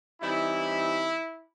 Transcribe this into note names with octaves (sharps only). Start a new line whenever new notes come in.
E3 G3 C4 D#4 E4